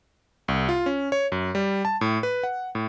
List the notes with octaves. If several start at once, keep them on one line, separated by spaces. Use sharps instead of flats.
C2
F4
C#4
C#5
F#2
G3
A5
A2
B4
F#5
A2